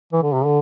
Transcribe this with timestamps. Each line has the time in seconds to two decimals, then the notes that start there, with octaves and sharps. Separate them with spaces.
0.13 E3
0.23 D3
0.34 C3
0.45 D3